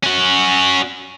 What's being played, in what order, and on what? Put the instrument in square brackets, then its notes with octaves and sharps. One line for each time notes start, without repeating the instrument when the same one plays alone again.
[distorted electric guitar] C#4 F#4